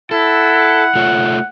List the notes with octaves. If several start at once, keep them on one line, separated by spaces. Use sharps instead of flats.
E4 A4 F#5
A3 F4 C#5